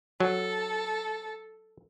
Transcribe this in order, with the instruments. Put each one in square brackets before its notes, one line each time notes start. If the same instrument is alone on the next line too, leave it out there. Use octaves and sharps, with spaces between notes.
[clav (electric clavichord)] F#3 [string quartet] A4